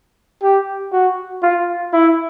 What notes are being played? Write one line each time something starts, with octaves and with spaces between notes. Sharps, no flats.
G4
F#4
F4
E4